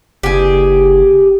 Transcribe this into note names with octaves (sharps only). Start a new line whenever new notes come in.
F#1 G4 G#4